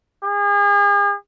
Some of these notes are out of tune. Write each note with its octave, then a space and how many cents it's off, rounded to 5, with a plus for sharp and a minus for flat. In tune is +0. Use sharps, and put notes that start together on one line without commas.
G#4 -40